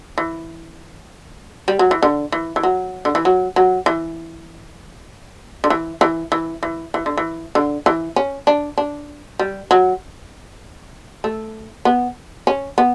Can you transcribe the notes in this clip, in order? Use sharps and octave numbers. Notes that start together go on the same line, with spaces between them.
E3
G3
F#3
E3
D3
E3
E3
F#3
D3
E3
F#3
F#3
E3
D3
E3
E3
E3
E3
E3
D3
E3
D3
E3
C#4
D4
D4
G3
F#3
A3
B3
C#4
B3